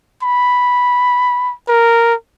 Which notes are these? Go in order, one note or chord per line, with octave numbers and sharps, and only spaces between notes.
B5
A#4